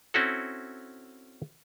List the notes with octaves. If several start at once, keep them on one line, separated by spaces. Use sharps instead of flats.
C4 C#4 E4 F#4 A4